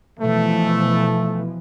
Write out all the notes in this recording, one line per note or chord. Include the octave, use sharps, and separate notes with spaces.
B2 E3 F3 A3